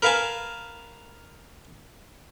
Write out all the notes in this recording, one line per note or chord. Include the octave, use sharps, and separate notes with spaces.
A#4 B4 F5 G#5 A5